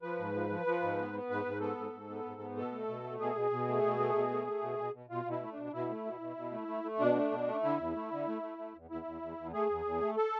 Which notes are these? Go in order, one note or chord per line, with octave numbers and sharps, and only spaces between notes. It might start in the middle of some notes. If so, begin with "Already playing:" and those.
F3 B4
G#2
F3
F3
F3
G#2
B3
B3
G#2 B4
G#2
B3 A4
G#2
G#2
B3
G#2
B3
B2 A4
A3
B2
A3
B2 G#4
B2
B2
A3
B2
A3
B2
A3
A3
B2
B2
B2
B2 F4
B2
E4
A3
B2 D4
B2 E4
A3
B2
B2
B2
A3
A3
A3
B2 D4
A3
B2
A3
D3 E4
E2
A3
D3
A3
A3
A3
E2
E2 E4
E2
E2
E2
A3 G#4
E2
E2
A3
A4